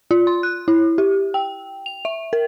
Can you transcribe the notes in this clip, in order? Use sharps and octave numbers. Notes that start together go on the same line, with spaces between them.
F4
C6
F#6
E4
G4
G5
F7
E5
A#4